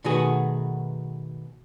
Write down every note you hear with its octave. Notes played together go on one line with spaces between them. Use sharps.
B2 D#3 A3 B3 F#4 G#4